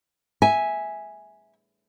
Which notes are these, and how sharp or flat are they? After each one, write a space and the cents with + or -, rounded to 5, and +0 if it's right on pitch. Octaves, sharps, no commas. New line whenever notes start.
E5 -10 G#5 +0